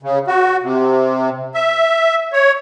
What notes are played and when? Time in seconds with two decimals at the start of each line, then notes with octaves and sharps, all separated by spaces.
0.03 C#3
0.27 F#4
0.63 C3
1.55 E5
2.33 C#5